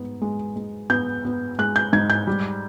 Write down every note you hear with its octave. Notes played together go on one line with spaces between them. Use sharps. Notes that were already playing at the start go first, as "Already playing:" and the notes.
Already playing: G#2 B3
G#3
G#3
B3 G6
B3
G#3 F#6
G6
G#2 G#6
G6
G3